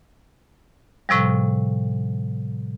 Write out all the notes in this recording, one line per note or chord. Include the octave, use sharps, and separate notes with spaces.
A2 C3 F3 G3